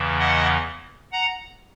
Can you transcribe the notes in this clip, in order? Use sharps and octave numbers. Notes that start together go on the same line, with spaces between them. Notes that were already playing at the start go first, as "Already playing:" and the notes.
Already playing: E2 C#3 E3
D#5 F#5
F#5 A#5